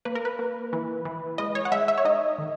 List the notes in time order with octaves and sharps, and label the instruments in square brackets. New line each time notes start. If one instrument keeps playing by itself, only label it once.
[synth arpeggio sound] A#3 B4
A#4
B4
A#3
E3
E3
G#3 D#5
C#5
F#5
G#3 E5
E5
C#5
D#4 D#5
D#3